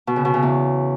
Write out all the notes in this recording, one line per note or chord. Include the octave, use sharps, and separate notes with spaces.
B2
C#3
B2
C#3
E2